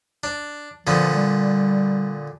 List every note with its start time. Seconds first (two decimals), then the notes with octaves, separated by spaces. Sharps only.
0.24 D4
0.87 A#2 D3 F3 B3
1.15 G3